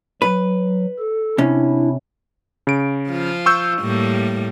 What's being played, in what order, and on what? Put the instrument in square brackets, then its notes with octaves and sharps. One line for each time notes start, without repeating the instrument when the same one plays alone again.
[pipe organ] F#3 [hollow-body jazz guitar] B4
[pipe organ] A4
[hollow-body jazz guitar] C3 C#4 [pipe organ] D4 E4
[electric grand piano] C#3 D7
[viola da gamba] F3 F4
[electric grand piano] C#6 E6 G6
[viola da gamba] A2 G3 A#3